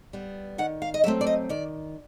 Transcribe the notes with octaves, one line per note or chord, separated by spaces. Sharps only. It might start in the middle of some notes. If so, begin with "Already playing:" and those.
G3 B3
D#3 F#5
F5
D#5
F#3 A3 C4 E5
D5
D#5
D#3 D5